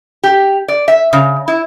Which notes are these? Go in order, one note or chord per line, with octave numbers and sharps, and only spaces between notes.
G4
D5
E5
C#3
E4